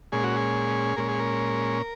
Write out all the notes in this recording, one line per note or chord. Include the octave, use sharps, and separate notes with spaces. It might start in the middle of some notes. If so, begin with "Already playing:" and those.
A#2 G#3 C#4 G#4
F#4
G#4
A#2 G#3 C#4 A#4
G#4
A#4